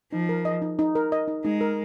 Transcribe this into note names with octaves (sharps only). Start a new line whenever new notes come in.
F3 D#4
A#4
D#5
D#4
D#4
A#4
D#5
D#4
G#3 D#4
A#4